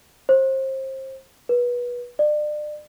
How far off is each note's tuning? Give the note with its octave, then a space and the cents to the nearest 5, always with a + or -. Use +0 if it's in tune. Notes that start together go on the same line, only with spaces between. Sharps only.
C5 +30
B4 -25
D5 +35